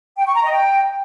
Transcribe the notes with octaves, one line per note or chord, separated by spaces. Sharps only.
G5
C#6
A#5
D#5
G5